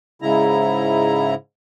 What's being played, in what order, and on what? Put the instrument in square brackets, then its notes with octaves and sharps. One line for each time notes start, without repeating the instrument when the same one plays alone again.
[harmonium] G#2 C#3 E4 A#5